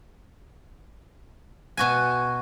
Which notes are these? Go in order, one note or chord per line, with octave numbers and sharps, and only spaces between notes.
B2 F#4 G#5